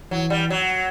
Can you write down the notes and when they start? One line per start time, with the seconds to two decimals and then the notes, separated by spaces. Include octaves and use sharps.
0.11 E3 F#3
0.30 G3
0.50 F#3